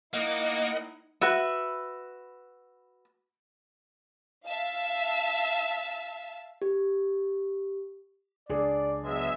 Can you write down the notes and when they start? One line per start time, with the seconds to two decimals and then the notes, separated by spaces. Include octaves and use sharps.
0.13 A#3 D#4 E4 D#5 F#5
1.21 F#4 B4 E5
4.47 E5 F5 A5
6.62 G4
8.49 C#2 D4 G#4 D5
9.03 B2 F#3 G#3 E5